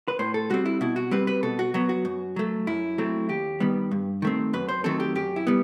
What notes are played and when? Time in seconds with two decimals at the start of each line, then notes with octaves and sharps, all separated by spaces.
0.08 B4
0.19 A2 C5
0.34 A4
0.50 G3 C4 F#4
0.65 E4
0.81 B2 E4
0.96 F#4
1.11 G3 C4 B4
1.27 B4
1.43 B2 A4
1.59 F#4
1.74 F#3 B3 F#4
1.89 F#4
2.05 F#2
2.36 F#3 A3
2.67 F#2 E4
2.98 F#3 A3 C4
3.29 D#2 G4
3.60 D#3 G3 B3
3.91 G2
4.22 D#3 A3 C4
4.53 F#2 B4
4.69 C5
4.84 D#3 F#3 A3 C4 A4
5.00 G4
5.15 F#2 G4
5.36 E4
5.47 G3 B3